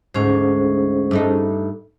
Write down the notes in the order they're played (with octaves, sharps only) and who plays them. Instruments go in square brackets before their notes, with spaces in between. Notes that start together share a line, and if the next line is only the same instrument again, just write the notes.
[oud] D2 G#2 [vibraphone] C#4 G#4 C5
[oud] G2 A3 D#4